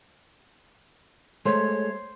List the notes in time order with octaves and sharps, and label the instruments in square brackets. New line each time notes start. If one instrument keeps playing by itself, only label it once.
[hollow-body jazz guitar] G#3 A3 [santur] C5 [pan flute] C#5